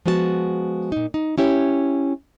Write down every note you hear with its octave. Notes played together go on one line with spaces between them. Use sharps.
F3 G#3 B3 F#4 D#5 A5
A#2 D#4
D#4
C#4 E4 G4 C#5